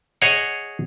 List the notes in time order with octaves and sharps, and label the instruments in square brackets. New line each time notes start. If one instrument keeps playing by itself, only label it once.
[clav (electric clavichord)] G#4 C#5 D#5 F#5